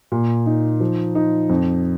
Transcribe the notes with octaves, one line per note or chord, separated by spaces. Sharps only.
A#2
D#4
F3
D#4
F2